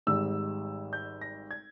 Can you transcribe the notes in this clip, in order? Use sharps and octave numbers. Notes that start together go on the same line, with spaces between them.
G#1 G#2 G3 E6
G6
A#6
G#6